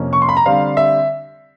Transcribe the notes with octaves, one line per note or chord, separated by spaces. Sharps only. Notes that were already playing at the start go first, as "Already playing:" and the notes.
Already playing: F2 C3 F3 A#3 C#4
C#6
C6
B5
A#5
D3 G3 C4 F5
E5